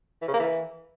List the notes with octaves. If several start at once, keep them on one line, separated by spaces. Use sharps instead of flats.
E3
C#3
A#3
E3